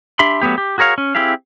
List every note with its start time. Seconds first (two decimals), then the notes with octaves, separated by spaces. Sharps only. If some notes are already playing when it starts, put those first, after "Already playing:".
0.19 D4 G4 E5 B5 C6
0.42 F#3 A3 B3 G4
0.58 G4
0.78 F#4 G#4 A#4 C#5 F5
0.98 C#4
1.15 C4 E4 G4 G#4 F5